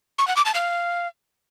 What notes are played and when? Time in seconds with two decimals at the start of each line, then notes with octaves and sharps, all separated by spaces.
0.18 C#6
0.28 F#5
0.37 D6
0.46 A5
0.55 F5